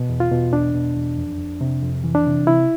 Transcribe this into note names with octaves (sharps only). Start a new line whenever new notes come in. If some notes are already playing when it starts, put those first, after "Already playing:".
Already playing: B2
E2
F4
B2
E2 D4
B2
E2
F2
F2
C3
F2
E3
D4
C3
C3 E4